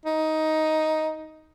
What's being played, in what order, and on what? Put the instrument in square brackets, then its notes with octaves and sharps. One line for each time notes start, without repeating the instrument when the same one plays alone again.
[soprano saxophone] D#4